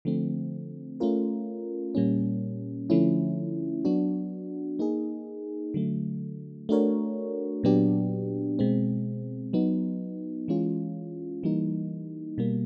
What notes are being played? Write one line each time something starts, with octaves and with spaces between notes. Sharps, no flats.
D3 F3 A3 C4
A3 C#4 F4 A#4
A#2 G3 A#3 C#4
D3 F3 A3 C#4 E4
F#3 B3 D4 F#4
A#3 D#4 G#4
D3 F#3 A3
A3 D4 F#4 A#4 C#5
A#2 F#3 B3 D4 G4
B2 G#3 C4
F#3 B3 D#4
E3 G#3 C#4 F4
E3 G3 A#3 D#4
B2 G3 A#3